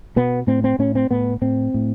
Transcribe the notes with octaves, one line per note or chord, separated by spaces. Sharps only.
B2 B3
A2 C4
C4
A2 C#4
C4
A2 B3
A2 C4
A2